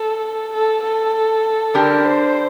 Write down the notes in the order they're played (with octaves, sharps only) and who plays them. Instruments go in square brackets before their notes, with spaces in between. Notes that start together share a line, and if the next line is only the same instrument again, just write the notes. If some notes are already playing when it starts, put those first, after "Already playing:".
Already playing: [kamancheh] A4
A4
A4
[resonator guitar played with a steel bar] D3 G3 D4 G4 [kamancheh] A#4
[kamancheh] C5